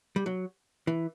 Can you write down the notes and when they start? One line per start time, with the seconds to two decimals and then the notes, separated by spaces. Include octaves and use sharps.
0.16 G3
0.26 F#3
0.87 E3